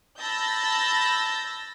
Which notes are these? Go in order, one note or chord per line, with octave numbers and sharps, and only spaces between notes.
A5 B5 E6 G6 A6 A#6